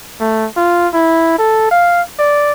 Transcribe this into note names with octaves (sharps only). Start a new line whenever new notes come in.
A3
F4
E4
A4
F5
D5